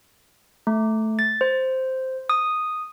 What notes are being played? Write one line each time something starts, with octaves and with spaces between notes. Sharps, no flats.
A3
A6
C5
D#6